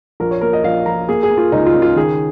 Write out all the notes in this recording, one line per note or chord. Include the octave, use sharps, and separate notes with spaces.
A#1 A#4
C#5
A#3 A#4
D#5
A#1 F5
A#1 A#5
A#3 G#4
G#4
A#3
F4
C#2 D#4
F4
C#3
F4
D#3 G#4